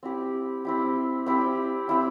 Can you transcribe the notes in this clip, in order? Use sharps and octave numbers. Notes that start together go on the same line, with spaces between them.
C4 E4 G4
C4 E4 G4
C4 E4 G4
C4 E4 G4